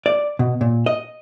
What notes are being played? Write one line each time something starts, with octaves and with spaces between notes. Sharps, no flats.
D5
B2
A#2
D#5